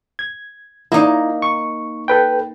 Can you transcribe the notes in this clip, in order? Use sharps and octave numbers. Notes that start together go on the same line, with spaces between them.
G#6
A#3 D#4 E4
C#6
A4 B4 G5